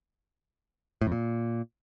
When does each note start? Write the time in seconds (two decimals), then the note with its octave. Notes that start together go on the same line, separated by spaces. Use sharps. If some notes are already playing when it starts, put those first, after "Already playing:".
1.01 A2
1.07 F2
1.12 A#2